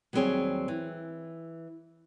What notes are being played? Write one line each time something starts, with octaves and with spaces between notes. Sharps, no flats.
D#2 F#3 G3 C4 G#4 C#5
E3